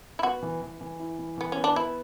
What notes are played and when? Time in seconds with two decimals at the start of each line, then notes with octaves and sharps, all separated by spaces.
0.19 E4
0.23 B3 F#4
0.43 E3
0.62 E3
0.81 E3
0.99 E4
1.19 E3
1.38 E3 B3
1.52 C#4
1.57 B3
1.64 D4
1.76 B3 E4